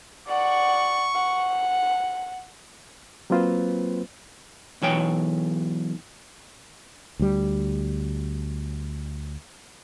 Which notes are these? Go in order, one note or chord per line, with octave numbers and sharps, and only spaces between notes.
D5 F#5 C#6
F#5
F#3 A#3 C4 F4 B4 C5
B1 E3 C#5 G5
D2 G3